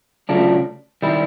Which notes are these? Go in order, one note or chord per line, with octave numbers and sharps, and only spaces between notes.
C#3 F#3 A3 D4 F4
D#3 G3 E4